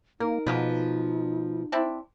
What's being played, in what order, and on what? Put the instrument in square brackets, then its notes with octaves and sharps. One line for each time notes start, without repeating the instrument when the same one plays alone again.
[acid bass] A#3 [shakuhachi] D#4 [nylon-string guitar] A#4
[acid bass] B2 [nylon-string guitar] F3 [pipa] G#3 A#3 B4
[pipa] C4 D4 E4